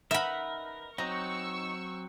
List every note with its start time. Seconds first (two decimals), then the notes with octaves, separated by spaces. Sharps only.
0.11 D#4 A#4 B4 E5 F#5 B5
0.98 F#3 C4 D#4 A#5 C#6 E6